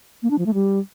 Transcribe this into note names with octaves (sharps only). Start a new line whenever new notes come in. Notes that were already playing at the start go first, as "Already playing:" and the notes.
A#3
D4
F3
A3
G3